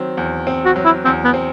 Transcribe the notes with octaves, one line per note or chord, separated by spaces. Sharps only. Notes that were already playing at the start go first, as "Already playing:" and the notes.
Already playing: D#3 F#3 C4
E2
C4
F#4
F#3
E4
E2 C4
B3
C4